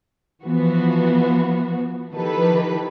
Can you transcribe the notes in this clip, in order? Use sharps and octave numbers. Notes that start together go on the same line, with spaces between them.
E3 F3 B3 F#4
D#3 F3 E4 G4 A4 B4